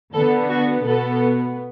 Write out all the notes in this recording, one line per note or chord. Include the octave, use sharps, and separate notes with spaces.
D3 B3 A4
F#4
B2 B3 A4